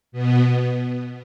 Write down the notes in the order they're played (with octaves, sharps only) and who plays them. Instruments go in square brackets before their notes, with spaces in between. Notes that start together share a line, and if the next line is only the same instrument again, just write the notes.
[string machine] B2 B3